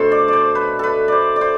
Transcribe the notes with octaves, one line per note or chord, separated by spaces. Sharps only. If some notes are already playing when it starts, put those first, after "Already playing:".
Already playing: B2 A3 D4 A4 C5
D5
C5 D5
B4
A4 B4
C5 D5
D5
C5